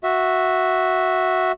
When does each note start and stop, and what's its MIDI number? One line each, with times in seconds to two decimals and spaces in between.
0.04 1.52 66
0.04 1.52 76